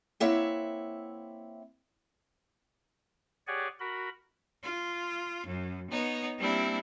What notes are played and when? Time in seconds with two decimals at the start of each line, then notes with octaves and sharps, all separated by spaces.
0.20 A#3 C4 E4 C#5 E5 F#5
3.47 G4 G#4 C#5 D5 F#5 G#5
3.80 F#4 A#4 B5
4.63 F4
5.46 F#2
5.90 B3 D#4 C#5
6.38 G3 A#3 C4 D4 E4